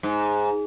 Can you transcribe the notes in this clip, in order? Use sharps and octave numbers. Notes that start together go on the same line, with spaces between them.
G#2